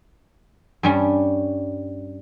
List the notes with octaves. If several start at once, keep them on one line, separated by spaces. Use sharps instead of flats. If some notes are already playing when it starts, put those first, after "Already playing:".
G2 G3 C#4